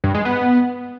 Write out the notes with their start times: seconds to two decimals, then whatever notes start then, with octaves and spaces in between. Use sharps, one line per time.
0.04 G2
0.14 G#3
0.25 B3